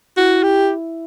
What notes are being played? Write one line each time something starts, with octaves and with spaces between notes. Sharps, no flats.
E4 F#4
G4